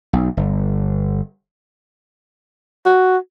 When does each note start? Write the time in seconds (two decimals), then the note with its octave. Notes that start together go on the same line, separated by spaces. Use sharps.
0.13 B1
0.37 G1
2.86 F#4